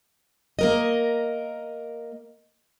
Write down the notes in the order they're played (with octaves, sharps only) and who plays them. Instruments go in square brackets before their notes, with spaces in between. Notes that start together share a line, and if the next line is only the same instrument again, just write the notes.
[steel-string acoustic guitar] A#3 A#4 D#5